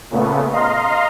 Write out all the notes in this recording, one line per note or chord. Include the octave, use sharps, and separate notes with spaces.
A#2 C#3 A3 B3
D#5 F5 A#5 C6